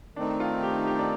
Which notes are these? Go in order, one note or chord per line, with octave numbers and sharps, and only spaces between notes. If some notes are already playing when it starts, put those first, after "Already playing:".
D#3 A3 C4 D4 D#4
F4
G4
G4
D4